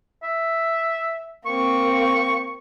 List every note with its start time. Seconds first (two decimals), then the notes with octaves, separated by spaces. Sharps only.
0.23 E5
1.46 A#3 C4 C#6